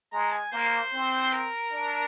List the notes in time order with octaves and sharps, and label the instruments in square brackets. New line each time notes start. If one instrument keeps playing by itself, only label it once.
[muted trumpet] G#3 [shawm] A#5
[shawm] G#5
[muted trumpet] A#3 [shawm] C5
[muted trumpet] C4
[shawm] A#4
[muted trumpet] D4